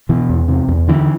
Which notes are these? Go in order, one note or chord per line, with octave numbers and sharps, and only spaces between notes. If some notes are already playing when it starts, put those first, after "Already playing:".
B2 E3
E2
C3
E2
D3 E3